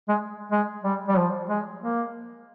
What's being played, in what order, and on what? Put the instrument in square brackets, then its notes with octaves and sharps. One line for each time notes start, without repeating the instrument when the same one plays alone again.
[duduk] G#3
G#3
G3
G3
F3
G#3
A#3